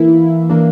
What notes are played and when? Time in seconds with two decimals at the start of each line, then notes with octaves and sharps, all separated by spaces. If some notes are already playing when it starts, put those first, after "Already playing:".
Already playing: E3 A#3 E4
0.50 E3 A#3 D4